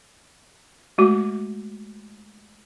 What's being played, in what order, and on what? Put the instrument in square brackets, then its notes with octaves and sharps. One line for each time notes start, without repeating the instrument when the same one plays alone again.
[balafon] G#3 A3 F#4 D6